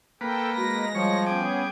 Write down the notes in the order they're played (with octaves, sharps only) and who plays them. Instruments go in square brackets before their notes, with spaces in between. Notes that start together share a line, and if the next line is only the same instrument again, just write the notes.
[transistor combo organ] A#3 B4 [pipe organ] A4 G5
[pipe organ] G#3 A#6 [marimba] F#4 B5
[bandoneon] F3 [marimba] G3 [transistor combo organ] C#5
[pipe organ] B3 C#4 G#4 [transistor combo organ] G5 G#5 D6